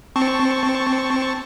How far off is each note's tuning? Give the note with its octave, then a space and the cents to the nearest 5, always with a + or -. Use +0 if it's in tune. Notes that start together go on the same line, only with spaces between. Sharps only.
C4 +0 A5 +0 C#6 +0